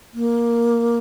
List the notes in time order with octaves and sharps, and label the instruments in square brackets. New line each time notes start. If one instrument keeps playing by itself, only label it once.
[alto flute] A#3